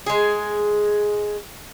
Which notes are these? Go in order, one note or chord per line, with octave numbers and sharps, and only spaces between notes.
G#3 G#4